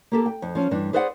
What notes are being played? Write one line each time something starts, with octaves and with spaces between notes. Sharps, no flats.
A#3 G4 A4
G5
F2
F3 C#4
G2 E3 D4
G#4 B4 C5 D5 E5 F#5